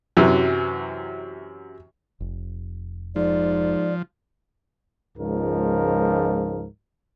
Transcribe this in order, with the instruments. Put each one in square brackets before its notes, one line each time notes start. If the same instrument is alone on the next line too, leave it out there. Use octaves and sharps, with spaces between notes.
[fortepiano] F#2 C3 E3 F#3
[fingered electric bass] F1
[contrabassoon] G#2 [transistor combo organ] F3 [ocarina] D5
[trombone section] C#2 G#2 F3 A#4